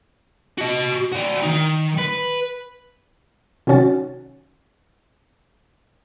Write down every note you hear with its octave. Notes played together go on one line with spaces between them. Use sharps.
F#4 D#5
F#4 D5
D#3 D#4
B4
C3 D#3 F#3 C#4 F#4 A6